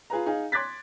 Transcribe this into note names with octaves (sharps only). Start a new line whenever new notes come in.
F4 G#4 B4 A#5
D#4 G#4 F5
C6 D6 F#6 G#6 A6 B6